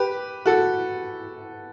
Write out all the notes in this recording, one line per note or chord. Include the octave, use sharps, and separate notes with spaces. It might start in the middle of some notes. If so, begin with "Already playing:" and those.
Already playing: G4 B4
F#4 A4